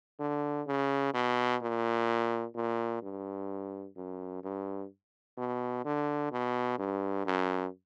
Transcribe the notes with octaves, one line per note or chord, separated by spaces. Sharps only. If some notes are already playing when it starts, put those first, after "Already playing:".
D3
C#3
B2
A#2
A#2
G2
F#2
G2
B2
D3
B2
G2
F#2